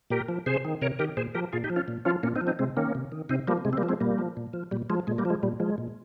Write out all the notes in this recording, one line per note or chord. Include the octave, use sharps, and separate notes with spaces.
A#2 G4 A#4
F3
C3 G#4 C5
D#3
C3 A#4 C#5
D#3 G4 A#4
A#2 G#4 C5
F3 G4 A#4
A#2 F4 G#4
D#4 G4
F3
C#4 F4
A#2
F3 C#4 F4
A#2 A#3 C#4
C4 D#4
F3
C4 D#4
C3 G#3 C4
D#3 A#3 C#4
C3
D#3
C3 C4 D#4
F3 G3 A#3
C3 G#3
C4
G3 A#3
F3
G#3 C4
A#2 G3 A#3
F3
A#2
F3
A#2 G3
F3 G#3
A#2 G#3
G3 A#3
F3
G#3
A#2 G3
F3 G#3
A#2